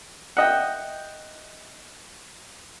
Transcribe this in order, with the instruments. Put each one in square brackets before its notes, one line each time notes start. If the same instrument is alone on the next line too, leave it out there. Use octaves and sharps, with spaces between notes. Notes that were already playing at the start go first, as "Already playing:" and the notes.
[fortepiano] D#5 F#5 [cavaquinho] E5 G5